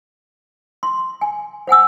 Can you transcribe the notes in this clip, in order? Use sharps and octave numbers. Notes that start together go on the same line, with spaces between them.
C6
G#5
C5 F#5 G#5 E6